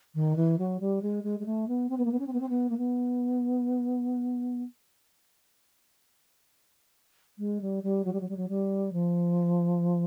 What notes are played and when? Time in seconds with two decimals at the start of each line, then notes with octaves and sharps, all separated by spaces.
0.14 D#3
0.35 E3
0.58 F#3
0.80 G3
1.02 G#3
1.23 G#3
1.39 G#3
1.45 A3
1.67 B3
1.89 C4
1.97 B3
2.04 A#3
2.11 B3
2.19 C#4
2.26 C4
2.32 B3
2.40 C4
2.48 B3
2.69 A#3
2.77 B3
7.38 G#3
7.61 G3
7.83 G3
8.04 F#3
8.12 G3
8.20 F#3
8.28 G3
8.36 F#3
8.48 G3
8.92 F3